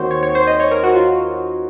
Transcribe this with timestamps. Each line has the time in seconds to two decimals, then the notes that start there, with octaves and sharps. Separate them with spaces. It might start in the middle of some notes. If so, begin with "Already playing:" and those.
Already playing: D#2 D#3 C4 F#4 C5 C#5
0.11 C#5
0.23 C#5
0.35 C5
0.47 D#5
0.60 C#5
0.71 A#4
0.84 F#4
0.95 F4